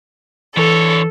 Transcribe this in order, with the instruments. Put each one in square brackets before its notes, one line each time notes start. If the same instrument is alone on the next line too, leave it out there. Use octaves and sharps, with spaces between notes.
[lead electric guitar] D3 C#5 [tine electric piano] E3 [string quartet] A4